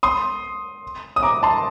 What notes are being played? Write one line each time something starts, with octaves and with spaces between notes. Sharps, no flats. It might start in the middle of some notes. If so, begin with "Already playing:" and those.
C6 D#6
D#6
A#5 D6
A5 C6